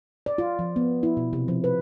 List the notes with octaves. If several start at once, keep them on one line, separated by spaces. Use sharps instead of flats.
D5
F4
F3
B3
E4
B2
C3
F3
B4